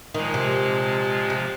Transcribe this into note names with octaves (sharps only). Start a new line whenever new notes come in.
A#2 D#3 F3 G#3
C3
C3